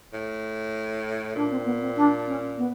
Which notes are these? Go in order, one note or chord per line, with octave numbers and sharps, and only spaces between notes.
A2
A#2 D4
C4
B3
C4
D4
C#4
B3